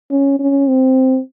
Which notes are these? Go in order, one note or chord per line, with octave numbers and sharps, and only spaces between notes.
C#4
C#4
C4